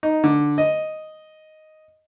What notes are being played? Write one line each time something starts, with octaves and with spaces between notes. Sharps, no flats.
D#4
D3
D#5